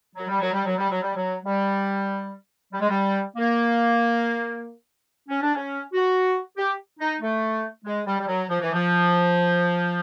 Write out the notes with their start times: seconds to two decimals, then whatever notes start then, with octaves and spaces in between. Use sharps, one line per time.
0.16 F#3
0.28 G3
0.40 F#3
0.52 G3
0.65 F#3
0.77 G3
0.90 F#3
1.02 G3
1.14 F#3
1.43 G3
2.72 G3
2.80 G#3
2.89 G3
3.36 A#3
5.28 C#4
5.41 D4
5.54 C#4
5.92 F#4
6.56 G4
6.99 D#4
7.20 A3
7.85 G#3
8.06 G3
8.19 G3
8.27 F#3
8.49 F3
8.60 E3
8.72 F3